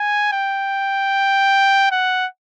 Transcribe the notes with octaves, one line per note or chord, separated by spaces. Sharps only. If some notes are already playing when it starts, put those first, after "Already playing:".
Already playing: G#5
G5
F#5